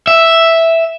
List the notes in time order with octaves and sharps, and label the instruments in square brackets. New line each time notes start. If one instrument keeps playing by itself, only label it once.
[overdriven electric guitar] E5